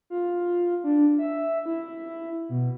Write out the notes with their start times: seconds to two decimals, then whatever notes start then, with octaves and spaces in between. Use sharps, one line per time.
0.10 F4
0.84 D4
1.18 E5
1.66 E4
2.49 B2